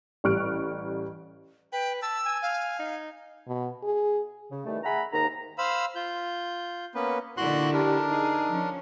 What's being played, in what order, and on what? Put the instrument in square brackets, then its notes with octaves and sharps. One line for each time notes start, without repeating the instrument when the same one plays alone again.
[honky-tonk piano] A1 G3 C#6 F6 F#6 D7
[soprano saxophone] B4 [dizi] G5
[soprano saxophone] A5 [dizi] E6
[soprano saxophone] G#5
[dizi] F5
[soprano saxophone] D#4
[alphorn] B2
G#4
[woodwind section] C#3
D#3 E3 G3 A3
G#4 E5 F#5 G#5 A#5 B5
D#2 G#2 A#5
[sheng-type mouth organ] C5 F5 B5 E6
F4 G6
A#3 B3 C#4 B4
[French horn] A#2 [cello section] D3 D#4 E4 [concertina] F#4 C6 F#6
[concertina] D4 A#4 [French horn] G4
[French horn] D#4 [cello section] G#4
[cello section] F3 C#4